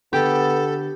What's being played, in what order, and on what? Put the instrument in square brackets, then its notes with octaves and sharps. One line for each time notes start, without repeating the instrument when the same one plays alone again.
[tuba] D3 [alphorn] B3 [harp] G4 [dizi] A4